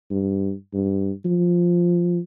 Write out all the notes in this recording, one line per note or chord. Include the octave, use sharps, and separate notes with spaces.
G2
G2
F3